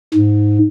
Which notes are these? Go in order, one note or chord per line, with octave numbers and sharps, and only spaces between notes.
G#2